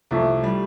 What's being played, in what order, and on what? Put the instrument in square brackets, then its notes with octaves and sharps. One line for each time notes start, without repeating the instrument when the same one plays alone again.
[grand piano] C2 [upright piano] F3 A3
[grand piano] G3